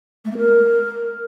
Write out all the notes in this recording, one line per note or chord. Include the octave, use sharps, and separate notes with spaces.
A3
A#3
A#4